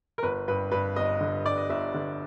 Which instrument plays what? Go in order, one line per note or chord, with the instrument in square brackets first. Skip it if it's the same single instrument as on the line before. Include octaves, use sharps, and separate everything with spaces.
[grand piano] A#4
G1 B4
G2 B4
G2 B4
G1 D#5
D3
G2 D5
D#5
G1 E5
D3